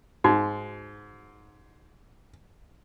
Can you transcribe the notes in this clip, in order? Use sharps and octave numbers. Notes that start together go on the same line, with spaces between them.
G#2 D#4 F#4